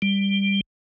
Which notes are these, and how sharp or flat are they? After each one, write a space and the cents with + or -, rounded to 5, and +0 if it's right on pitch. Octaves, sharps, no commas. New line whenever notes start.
G3 +15